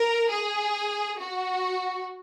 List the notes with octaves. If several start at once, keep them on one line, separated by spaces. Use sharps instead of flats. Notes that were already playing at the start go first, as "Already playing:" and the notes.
Already playing: A#4
G#4
F#4